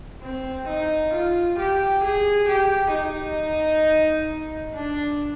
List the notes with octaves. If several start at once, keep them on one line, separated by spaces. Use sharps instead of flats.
C4
D#4
F4
G4
G#4
G4
D#4
D4